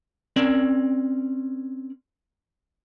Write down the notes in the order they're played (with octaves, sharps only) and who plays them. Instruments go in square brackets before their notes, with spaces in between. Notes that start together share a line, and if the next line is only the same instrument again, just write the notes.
[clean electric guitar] C4 C#4 A#4 D5